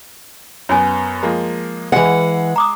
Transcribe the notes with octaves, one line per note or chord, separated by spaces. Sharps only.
F#2 B3 C#5 G#5
F3 G#3 A#3
E3 G#3 F#5
A#5 D6 D#6